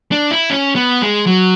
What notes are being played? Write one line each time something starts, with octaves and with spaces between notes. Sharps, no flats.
D4
E4
C#4
B3
G#3
F#3